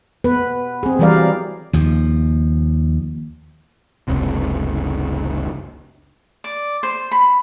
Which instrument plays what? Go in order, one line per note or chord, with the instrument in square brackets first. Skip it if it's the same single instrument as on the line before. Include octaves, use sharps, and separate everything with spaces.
[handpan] B3 B4
C4 G#4
E3 F#3 G3 A#4 D5 F5
[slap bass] D#2 F3
[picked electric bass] F#1 C#2 C3
[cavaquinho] D5
C5
B5